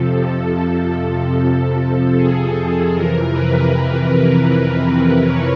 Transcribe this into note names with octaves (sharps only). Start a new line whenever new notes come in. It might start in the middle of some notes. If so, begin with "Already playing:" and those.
Already playing: F2 C3 F3 A4
A4
G#4
A4
F2 C3 E3 A#4
B4
C#5